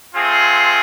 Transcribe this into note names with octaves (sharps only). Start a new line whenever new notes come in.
A3 C4 F4 G#4